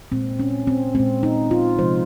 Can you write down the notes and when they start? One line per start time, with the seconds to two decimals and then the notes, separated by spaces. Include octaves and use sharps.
0.12 A#2 G#3 C4
0.40 C#4
0.67 C4
0.95 A#2 G#3 C4
1.23 D#4
1.51 F4
1.79 C3 F3 G#3 C5